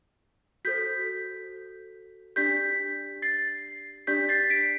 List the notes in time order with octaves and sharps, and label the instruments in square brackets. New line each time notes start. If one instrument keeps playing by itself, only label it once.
[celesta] F#4 A4 C5 G6 B6
D4 G4 D5 G6 B6
A6 C7
D4 G4 D5 G6 B6
A6 C7
B6 D7